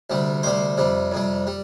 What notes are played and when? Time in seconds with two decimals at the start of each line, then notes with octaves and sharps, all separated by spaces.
0.10 D2 C3 G3
0.43 D2 C3 G3 C5
0.77 F2 C3 G3
1.12 F2 C3 G3
1.47 G3